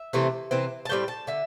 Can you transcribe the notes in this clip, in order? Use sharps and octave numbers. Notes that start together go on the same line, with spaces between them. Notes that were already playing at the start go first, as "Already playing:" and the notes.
Already playing: E5
C3 E3 A3 C4
C3 E3 C4
A5
A2 G3 C4 G5
A5
D3 E5